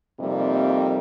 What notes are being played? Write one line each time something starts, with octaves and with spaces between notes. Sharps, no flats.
F2 C3 G3 A#3 D#4